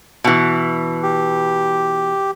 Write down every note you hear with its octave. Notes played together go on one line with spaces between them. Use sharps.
B2 E3
G4